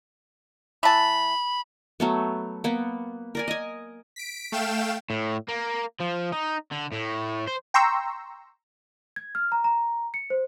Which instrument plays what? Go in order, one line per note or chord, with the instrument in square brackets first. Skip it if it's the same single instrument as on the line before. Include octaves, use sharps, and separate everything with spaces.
[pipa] E3 A5 [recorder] B5
[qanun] F#3 A3 B3
A#3 B3
A#4 D5 G#5
D#5 G#5
[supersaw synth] B6 D7
A3 F5 G5 E7
[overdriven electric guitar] A2
A#3
F3
D#4
D3
A2
C5
[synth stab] G5 A#5 C6 C#6 E6
[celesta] G#6
F6
A#5
A#5
C#7
C5